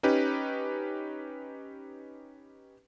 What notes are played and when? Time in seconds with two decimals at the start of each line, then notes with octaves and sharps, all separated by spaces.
0.03 C#4 D#4 G4 B4